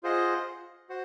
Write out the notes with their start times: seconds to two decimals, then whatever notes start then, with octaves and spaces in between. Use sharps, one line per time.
0.03 F4 G#4 C5 D#5 F#5
0.89 F#4 C5 F#5